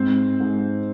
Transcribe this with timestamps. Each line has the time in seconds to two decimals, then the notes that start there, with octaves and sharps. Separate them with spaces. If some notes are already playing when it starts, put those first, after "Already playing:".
Already playing: G#2 C4 C5
0.40 G#2